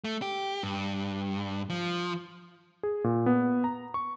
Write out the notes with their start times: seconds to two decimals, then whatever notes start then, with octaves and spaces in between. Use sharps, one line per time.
0.04 A3
0.22 G4
0.63 G2
1.70 F3
2.83 G#4
3.04 A#2
3.26 B3
3.64 A#5
3.94 C#6